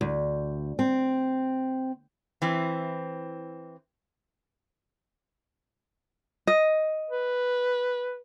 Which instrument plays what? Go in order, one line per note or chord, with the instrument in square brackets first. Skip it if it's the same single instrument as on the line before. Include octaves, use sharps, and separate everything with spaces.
[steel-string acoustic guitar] D2
C4
[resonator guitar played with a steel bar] E3 C4
[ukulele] D#5
[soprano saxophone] B4